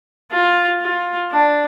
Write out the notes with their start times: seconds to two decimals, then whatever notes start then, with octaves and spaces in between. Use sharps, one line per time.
0.32 F4
0.81 F4
1.32 D4